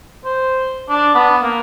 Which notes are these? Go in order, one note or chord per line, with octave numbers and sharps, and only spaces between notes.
C5
D4
B3
A#3